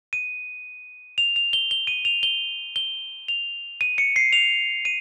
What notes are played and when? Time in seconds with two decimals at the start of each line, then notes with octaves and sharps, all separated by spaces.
0.13 D#7
1.18 F7
1.36 F7
1.53 G7
1.71 G7
1.87 D#7
2.05 F7
2.23 G7
2.76 G7
3.28 F7
3.81 D#7
3.98 C#7
4.16 C7
4.33 F7
4.85 D#7